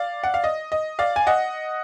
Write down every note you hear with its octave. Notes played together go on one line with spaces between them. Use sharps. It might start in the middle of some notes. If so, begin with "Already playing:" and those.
Already playing: D5 F5
F#5
F5
D#5
D#5
D5 F5
G#5
D#5 F#5